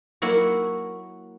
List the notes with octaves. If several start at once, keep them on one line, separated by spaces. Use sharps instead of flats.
F#3 A#3 E4 F#4